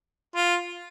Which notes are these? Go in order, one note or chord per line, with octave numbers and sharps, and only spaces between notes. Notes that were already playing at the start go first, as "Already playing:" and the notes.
F4